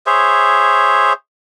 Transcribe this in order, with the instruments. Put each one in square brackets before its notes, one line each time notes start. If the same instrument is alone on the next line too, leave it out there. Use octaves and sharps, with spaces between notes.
[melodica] G#4 C5 C#5 E5